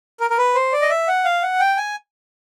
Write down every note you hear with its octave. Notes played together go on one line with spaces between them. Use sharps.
A#4
A#4
B4
C5
D5
D#5
E5
F#5
F5
F#5
G5
G#5